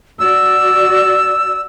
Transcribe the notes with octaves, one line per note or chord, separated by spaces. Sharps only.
F#4 D5 E6